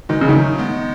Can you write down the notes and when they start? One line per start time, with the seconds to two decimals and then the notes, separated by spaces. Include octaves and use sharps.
0.09 D#3 E3 G#3
0.21 C#3
0.29 D#3 F#3 A3
0.58 G#3 B3